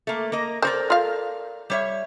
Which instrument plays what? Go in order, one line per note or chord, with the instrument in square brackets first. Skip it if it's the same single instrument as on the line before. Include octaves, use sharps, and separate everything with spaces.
[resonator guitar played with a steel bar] A3 A#3
A#3 A#4 D#5
[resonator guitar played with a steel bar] A4 A#4 D5 [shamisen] C5
[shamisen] F4 F5
[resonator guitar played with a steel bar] G3 C#5 E5